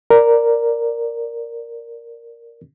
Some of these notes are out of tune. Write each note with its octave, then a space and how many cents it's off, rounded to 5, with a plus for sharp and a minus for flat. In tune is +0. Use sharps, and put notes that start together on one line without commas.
A#4 +0 D5 +0